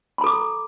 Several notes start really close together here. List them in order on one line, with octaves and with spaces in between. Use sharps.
B5 A#5 A4 D6